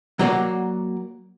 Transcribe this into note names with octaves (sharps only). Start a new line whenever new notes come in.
F#3 A#3 F#4 C#5 D5